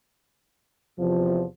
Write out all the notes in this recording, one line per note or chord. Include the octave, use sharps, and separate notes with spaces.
E2 C3 F3